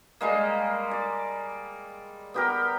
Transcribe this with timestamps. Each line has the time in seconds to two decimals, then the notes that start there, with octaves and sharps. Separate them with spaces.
0.21 G3 G#3 A#3
0.91 D5
2.34 B3 G4 A#4